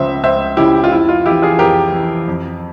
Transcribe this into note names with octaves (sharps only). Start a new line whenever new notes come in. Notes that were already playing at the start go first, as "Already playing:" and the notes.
Already playing: C#2 C#3 F3 C5 E5
C#2 C5 E5
C#3 F3 E4 G4
F4
F2 E4
F4
E3 E4 G4
F4 G#4
F2 G4 A#4
E3
F2